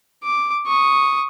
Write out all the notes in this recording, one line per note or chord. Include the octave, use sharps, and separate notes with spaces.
D6
C#6 D#6